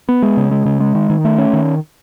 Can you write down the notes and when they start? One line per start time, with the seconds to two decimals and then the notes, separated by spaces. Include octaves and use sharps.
0.09 B3
0.22 G#3
0.37 C#3
0.51 G#3
0.65 C#3
0.80 G#3
0.95 D#3
1.10 D#3
1.25 A3
1.38 C#4
1.53 D#3